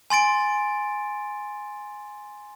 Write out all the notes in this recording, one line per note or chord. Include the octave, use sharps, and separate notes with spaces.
G#5 C6 A6 D7